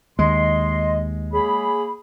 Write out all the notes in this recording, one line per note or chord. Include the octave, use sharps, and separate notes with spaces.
D#2 G#3 D#5 C6
A#3 G#4 C#5 B5